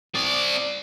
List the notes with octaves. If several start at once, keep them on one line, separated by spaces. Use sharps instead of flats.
C4 D5